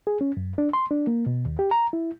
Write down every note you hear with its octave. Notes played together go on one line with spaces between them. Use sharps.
G#4
C#4
F#2
D4
C6
D4
A#3
B2
D#2
G4
A#5
E4